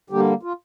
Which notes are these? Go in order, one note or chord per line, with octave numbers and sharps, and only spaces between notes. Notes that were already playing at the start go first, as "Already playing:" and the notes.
D3 G3 A#3 G4
F4